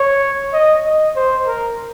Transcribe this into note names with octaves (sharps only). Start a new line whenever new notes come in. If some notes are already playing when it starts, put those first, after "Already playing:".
Already playing: C#5
D#5
D#5
C5
A#4